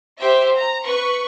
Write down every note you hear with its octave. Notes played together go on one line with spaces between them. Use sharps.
G4 C5 E5
A#5
B4 C#6